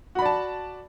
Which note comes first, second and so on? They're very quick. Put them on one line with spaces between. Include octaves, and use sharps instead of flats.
F#4 B5 D5 A5